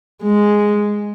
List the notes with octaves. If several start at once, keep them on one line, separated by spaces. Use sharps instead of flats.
G#3